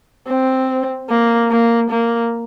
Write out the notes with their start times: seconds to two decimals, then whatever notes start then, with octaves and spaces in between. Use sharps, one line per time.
0.28 C4
1.10 A#3
1.51 A#3
1.91 A#3